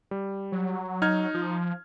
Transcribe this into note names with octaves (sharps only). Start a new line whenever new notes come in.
G3
F#3
D#4 F6 G#6
F3